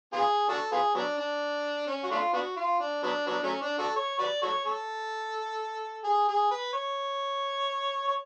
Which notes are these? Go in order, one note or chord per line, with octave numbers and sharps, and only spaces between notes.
B3 F4 G#4
D4 F#4 A4
B3 F4 G#4
F#3 B3 D4
D4
C#4
F#4
A3 D4 F4
B3 D4 F#4
F4
D4
F#3 B3 D4
F#3 B3 D4
F#3 A3 C#4
D4
D4 F#4 A4
C#5
F#4 B4 D5
F#4 A4 C#5
A4
G#4
G#4
B4
C#5
C#5